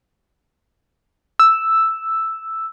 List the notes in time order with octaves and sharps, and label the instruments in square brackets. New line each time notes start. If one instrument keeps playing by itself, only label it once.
[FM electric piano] E6